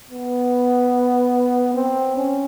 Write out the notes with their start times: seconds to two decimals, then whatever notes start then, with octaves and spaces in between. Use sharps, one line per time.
0.11 B3
1.74 C4
2.16 C#4